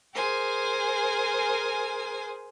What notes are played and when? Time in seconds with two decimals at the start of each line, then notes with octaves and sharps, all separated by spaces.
0.14 G#4 A#4 C5 G#5